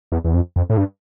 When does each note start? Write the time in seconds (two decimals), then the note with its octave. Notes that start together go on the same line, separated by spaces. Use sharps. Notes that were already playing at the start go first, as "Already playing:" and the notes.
0.12 E2
0.25 E2
0.34 F2
0.56 F2
0.70 A2
0.77 G2